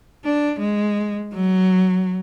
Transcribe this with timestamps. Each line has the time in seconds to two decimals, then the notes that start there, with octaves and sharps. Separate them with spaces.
0.25 D4
0.59 G#3
1.34 F#3